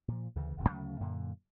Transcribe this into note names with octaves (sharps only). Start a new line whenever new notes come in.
A#2 F3
D2 C#3 E3
D1 G#1 F2 C3
D2 C#3 F#3 A3
F#2 A#2 D3